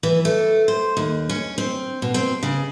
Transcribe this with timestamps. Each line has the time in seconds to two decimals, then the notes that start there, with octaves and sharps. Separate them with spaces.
0.03 E3
0.25 A3
0.68 C5
0.97 D#2
1.29 C#4
1.58 C4
2.02 B2
2.14 C4
2.43 C#3